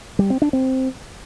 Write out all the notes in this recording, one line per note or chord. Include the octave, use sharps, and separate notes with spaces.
G3
C4
D4
C4